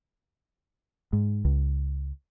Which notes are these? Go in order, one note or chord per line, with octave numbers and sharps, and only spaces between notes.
G#2
C#2